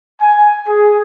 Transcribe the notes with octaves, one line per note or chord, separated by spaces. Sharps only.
G#5
G#4